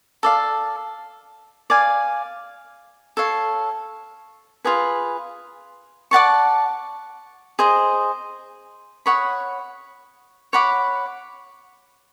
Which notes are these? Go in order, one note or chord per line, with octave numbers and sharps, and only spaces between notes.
A4 D5 F5
D5 F5 G#5
A4 C#5 F5
F4 G#4 B4
D5 F#5 A5 C#6
G#4 C5 D#5
C#5 F#5 B5 D#6
C#5 F#5 B5 D6